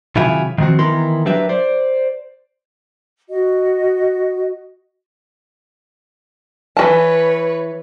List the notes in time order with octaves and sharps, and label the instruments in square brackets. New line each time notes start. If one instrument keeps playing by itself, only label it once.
[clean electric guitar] C3 D#3 F#3 E4 F4 G#4
D#3 F3 C4 F#4
D#3 E3 B3 E4 A#4 C6
F#3 D4 G4 A#4 B4 E5
C5 D5
[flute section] F#4 D#5
[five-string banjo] E3 F#4 A5 [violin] B4 C#5